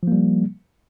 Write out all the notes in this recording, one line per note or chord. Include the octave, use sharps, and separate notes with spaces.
F3 G3 A#3